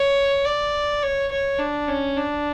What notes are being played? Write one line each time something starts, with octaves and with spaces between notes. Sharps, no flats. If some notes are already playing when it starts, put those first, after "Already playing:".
Already playing: C#5
D5
C#5
C#5
D4
C#4
D4